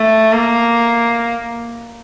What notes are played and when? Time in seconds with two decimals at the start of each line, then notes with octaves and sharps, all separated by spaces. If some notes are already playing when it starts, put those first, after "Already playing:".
Already playing: A3
0.32 A#3